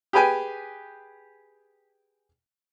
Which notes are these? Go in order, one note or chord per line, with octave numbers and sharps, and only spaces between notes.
G4 G#4 B4 G5 G#5